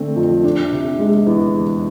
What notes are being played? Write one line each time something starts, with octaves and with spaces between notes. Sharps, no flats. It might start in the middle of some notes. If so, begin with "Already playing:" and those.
Already playing: D3 A3 C4
F2
D4
C3
G#3
E2